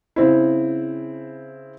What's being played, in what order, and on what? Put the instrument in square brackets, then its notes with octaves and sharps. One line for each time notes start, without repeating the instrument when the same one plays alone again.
[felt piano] C#3 C4 E4